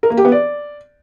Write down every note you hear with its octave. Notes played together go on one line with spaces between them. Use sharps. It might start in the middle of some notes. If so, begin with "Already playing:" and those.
A#4
A#3
G4
B3
D5